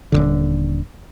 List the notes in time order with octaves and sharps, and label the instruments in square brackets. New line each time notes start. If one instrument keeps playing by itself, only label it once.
[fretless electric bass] D#1 B1 D3